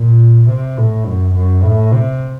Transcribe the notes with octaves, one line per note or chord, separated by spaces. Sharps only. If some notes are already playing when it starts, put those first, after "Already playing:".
Already playing: A#2
C3
A2
F#2
F#2
A2
C3